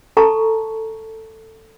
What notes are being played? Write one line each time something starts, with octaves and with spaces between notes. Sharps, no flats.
A4 A5 A#5 C#6